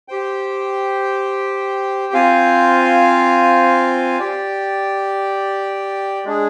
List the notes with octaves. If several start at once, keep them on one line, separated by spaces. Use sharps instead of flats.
G4 C5 G5
C4 F4 C5 F5 G#5
G4 D5 G5
G#3 D4 G#4